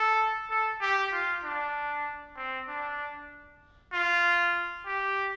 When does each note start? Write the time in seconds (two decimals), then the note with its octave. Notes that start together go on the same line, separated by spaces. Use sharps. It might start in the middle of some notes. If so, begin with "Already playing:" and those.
Already playing: A4
0.50 A4
0.81 G4
1.12 F4
1.44 D4
2.37 C4
2.68 D4
3.93 F4
4.86 G4